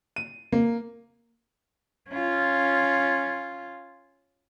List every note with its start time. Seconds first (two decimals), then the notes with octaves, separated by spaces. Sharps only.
0.16 D#7
0.52 A#3
2.09 C#4 F4